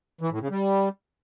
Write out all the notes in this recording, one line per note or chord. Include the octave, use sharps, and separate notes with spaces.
E3
A2
C#3
G3